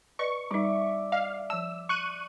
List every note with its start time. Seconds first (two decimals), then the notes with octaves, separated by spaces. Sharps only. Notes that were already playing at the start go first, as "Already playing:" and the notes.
0.19 B4 D5 D#5 C#6
0.51 G3 D#4 D5 E5
1.12 D#5 F5
1.50 F3 A5 E6
1.89 C#6 F#6 D#7